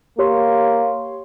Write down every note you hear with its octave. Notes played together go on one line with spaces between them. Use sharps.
A#3 G4 C#5 C6